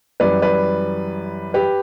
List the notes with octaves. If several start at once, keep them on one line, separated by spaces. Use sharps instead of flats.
F#2 E3 G3 B4 D5
B4 D5
G4 B4